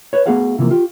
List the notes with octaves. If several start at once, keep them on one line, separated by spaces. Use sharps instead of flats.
B4 C#5
A3 B3 F#4 G#4 F5 F#5
C3 E3 F3 A#3
F4 G4